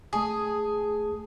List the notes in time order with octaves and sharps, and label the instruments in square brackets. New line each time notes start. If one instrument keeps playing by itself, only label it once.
[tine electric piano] A3 A5 D#6 [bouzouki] G#4